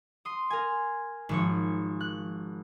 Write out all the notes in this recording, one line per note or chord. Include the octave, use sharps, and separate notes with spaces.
C6 D#6
A#4 G#5
G#1 F3 C#5
F#6